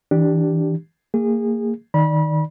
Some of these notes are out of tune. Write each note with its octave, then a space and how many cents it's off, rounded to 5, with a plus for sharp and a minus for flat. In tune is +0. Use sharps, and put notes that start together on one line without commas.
E3 -30 D4 +0 G4 +0
A#3 -30 G#4 -25
D#3 +0 D5 +0 B5 -30